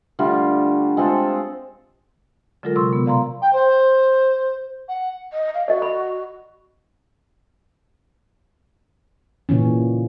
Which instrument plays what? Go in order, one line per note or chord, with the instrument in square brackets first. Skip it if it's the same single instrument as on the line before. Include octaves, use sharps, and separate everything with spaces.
[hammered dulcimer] D3 G3 A3 F4
G#3 C4 F4 A4
[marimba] D3 F#3 G#3 F4 A4 A#4
C3 C6 C#6 E6
B2 B3
D5 F5 A#5 C6
[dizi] G5
C5
F#5
[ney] D#5
F5
[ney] F#4 [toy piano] D5 D#5
[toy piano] B5
[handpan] A#2 C#3 E3 C#4